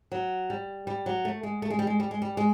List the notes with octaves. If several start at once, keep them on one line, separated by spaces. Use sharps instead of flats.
F#3
G3
G3
F#3
A3
G#3
A3
G#3
G3
G#3
G3
G#3
G3
G#3